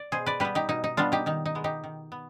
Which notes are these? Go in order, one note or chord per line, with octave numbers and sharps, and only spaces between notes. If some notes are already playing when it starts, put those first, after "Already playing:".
Already playing: D5
B2 G#4 C5
B4 D5
G3 B3 G4 B4
D#4 G4
B2 D#4
D#4
G3 B3 D4 F4
D#4 G4
D#3 D#4
D#4
G#3 B3
D#4 G4
D#3
B3